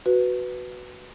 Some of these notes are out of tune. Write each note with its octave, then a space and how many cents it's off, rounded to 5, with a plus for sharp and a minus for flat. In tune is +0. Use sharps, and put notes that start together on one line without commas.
F#4 +0 B4 +5